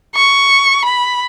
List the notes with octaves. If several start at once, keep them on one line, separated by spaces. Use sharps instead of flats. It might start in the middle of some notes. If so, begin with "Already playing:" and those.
C#6
B5